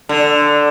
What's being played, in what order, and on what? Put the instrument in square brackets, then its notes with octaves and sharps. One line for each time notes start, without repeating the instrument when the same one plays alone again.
[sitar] D3